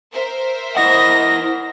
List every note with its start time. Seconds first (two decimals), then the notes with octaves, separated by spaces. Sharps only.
0.12 A#4 C5 E5
0.77 E4 D#5 F#5 A#6